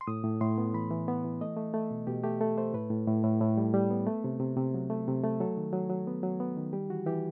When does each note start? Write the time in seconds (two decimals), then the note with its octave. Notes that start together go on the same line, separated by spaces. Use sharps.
0.01 C6
0.07 A2 D#6
0.24 A2
0.41 A2 C6
0.58 B3
0.74 E3 B5
0.91 E3
1.08 B3
1.24 E3
1.41 A3 D#5
1.57 A3
1.74 A3
1.91 B2
2.07 B2 G4
2.23 A3 G4
2.40 A3 A4
2.58 A3 C5
2.74 A2 B4
2.90 A2
3.07 A2
3.24 A2
3.41 A2
3.57 G3
3.74 G3
3.91 B3
4.07 A3
4.24 C3
4.40 C3
4.57 C3
4.74 F#3
4.90 A3
5.08 C3
5.24 A3
5.40 F#3 A4
5.57 D#3
5.73 F#3
5.90 F#3
6.07 B3
6.23 F#3
6.40 B3
6.57 D#3
6.73 G3 G4
6.90 E3 F#4
7.06 E3 G4